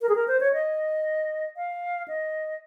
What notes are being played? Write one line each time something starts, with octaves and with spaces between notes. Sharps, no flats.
A#4
G#4
A#4
C5
C#5
D#5
F5
D#5